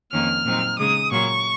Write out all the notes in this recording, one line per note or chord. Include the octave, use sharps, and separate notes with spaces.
F2 D#3 A#3 C#4 F6
A#2 F#3 C4 D#4
C#3 G#3 D#4 D#6
A#2 F#3 A#3 C#6